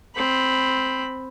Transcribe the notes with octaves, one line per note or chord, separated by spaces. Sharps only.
C4 B5